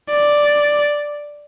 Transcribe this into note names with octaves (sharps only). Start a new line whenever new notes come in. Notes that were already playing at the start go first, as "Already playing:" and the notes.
D5